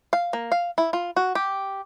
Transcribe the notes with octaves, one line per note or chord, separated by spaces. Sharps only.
F5
A#3
F5
E4
F4
F#4
G4